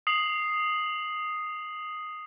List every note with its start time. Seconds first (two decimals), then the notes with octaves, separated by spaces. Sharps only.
0.07 D#6 C7 F7 F#7